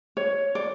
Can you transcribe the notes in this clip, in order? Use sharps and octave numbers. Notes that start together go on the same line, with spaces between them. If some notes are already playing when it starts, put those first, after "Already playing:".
C#5
D5